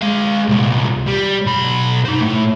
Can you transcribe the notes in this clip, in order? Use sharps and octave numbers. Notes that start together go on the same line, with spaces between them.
G#3 F5
C2 A#2
G3
B1 B5
D#4 C5
A2